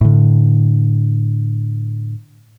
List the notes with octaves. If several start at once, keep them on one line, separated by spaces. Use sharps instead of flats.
A2 D3